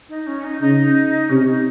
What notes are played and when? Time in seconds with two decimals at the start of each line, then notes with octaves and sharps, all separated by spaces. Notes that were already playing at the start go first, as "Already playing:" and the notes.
0.09 D#4
0.27 C#4
0.44 D#4
0.61 C#3 D#4
1.29 C3 C#4
1.47 D#4